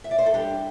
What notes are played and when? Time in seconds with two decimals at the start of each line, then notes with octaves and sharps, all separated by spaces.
0.04 E5
0.11 D5
0.18 C5
0.26 A4
0.34 G3 D4 G4